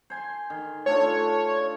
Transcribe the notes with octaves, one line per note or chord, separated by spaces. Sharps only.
C5 G#5 C6
D#3
A3 D4 F4 C#5